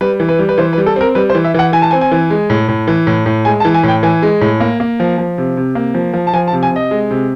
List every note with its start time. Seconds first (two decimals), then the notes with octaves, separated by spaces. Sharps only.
0.01 G3 B4
0.20 E3
0.29 B4
0.39 G3
0.49 B4
0.58 E3 C5
0.73 B4
0.78 G3
0.86 A4
0.96 C4 A#4
1.15 G3 B4
1.30 C5
1.35 E3
1.44 E5
1.54 E3 F#5
1.73 E3 G#5
1.82 A5
1.91 C4 G#5
2.01 G#5
2.12 E3
2.30 G#3
2.50 A2
2.68 A2
2.87 E3
3.07 A2
3.26 A2
3.45 G#3 G#5
3.60 A5
3.65 E3
3.74 G#5
3.83 A2
3.88 G5
4.03 E3 G#5
4.23 G#3
4.41 A2
4.60 A#3
4.80 A#3
5.00 F3
5.18 F3
5.38 C3
5.57 C3
5.75 A#3
5.94 F3
6.14 F3
6.27 A5
6.33 F3 G#5
6.47 A5
6.53 C3
6.63 G#5
6.71 C3 D#5
6.91 G#3
7.11 C3